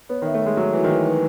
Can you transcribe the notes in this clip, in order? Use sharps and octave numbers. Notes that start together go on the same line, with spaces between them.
B3 C#5
D#3
E5
A3
G#3 C#5
F#3 C#5
E3 F#4
D#3
E3 D#4
B4